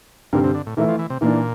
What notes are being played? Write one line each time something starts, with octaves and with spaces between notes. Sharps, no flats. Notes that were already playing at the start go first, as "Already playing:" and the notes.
G2 A#2 D3 G3 C4
C3
D3
A2
A#2 E3 A3 E4
F3
E3
C3
A#2 E3 A#3 D4